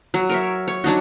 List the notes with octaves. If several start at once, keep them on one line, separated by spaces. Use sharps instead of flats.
F#3
A#4 C#5 E5
C#5
F#3 D4 D#4 F#4